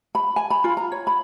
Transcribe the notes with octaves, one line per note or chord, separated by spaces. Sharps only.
B5
G#5
B5
F4
A#5
C#5
B5